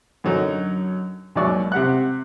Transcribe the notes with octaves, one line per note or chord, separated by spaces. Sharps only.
F#2 D3 F#3 D#4
D#2 G#2 F#3 D5 C#6
C3 G4 F#5 F#6